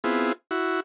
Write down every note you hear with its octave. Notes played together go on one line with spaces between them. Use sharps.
B3 C4 E4 F4 G#4
E4 F#4